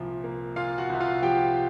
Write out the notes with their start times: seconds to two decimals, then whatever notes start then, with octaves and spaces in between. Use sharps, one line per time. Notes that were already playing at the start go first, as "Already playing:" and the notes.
Already playing: C2 A#2 F3 E4
0.24 A#3
0.56 A#2 F4 F5
0.78 F#4 F#5
0.90 C2 E5
1.00 F4 F5
1.22 F3 G4 G5